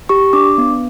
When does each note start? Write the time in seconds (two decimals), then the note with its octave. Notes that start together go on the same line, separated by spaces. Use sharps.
0.09 G4 C#6
0.33 D4 D6
0.58 B3